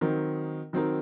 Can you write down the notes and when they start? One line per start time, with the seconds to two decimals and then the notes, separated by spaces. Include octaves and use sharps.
0.01 D#3 F#3 C4 D#4 A#4
0.73 D#3 F#3 C4 D#4 A#4